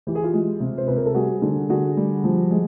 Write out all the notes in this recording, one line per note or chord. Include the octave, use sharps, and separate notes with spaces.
E3 G4
G#4
F4 G4
G#3
C3
C5
C3 B4
A#4
A4
G3 F#4 G#4
D3
D3 F#4 G#4
G3
F3
G#3